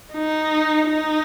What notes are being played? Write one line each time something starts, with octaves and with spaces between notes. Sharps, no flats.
D#4
D#4